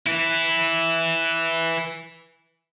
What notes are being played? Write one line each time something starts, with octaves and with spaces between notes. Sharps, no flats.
E3 E4